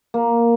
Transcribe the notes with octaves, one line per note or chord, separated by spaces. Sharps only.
A#3